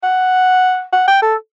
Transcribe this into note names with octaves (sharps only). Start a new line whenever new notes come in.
F#5
F#5
G5
A4